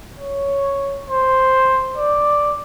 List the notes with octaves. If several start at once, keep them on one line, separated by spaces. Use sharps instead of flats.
C#5
C5
D5